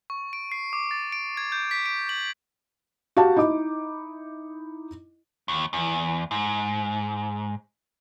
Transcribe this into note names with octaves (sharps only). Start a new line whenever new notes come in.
C#6
D7
C7
D6
A6
D7
G#6
G6
B6
D7
F#7
F#4 G4 F5 A5
D#4 E4 D#5 D6
D#2
E2
G#2